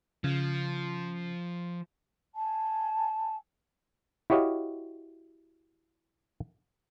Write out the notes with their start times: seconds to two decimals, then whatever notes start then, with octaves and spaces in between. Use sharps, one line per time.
0.24 C#3 F3
2.35 G#5 A5
4.30 E4 F#4 G4 C#5 D#5 F5